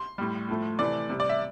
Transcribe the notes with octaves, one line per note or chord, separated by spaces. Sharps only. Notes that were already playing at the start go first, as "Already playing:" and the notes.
Already playing: C6
A2 G3
A2 F3 A3
C3 E3 A3 D5
C3 G3
D5
E5